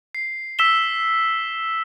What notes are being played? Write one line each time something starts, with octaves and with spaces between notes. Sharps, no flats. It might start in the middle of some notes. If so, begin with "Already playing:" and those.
C7
E6 B6 E7 G7